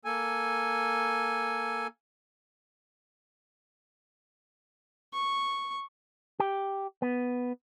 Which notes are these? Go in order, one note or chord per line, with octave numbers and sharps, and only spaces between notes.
A#3 A4 G#5
C#6
G4
B3